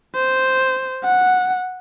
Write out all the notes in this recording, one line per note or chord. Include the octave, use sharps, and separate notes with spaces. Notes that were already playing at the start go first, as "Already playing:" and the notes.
C5
F#5